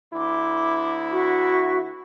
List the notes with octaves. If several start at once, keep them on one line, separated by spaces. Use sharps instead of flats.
D2 E4 C6 D6
F#4 E5 C#6